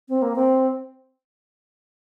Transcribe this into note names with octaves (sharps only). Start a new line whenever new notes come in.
C4
A#3
C4